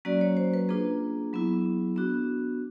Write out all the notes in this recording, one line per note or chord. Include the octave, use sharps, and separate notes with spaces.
F#3 A#3 C#4 F#4 D5
C#5
C5
B4
A#3 D4 F4 G#4
F#3 B3 E4
B3 D4 F#4